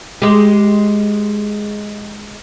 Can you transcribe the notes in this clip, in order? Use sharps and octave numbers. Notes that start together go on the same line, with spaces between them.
G#3 G4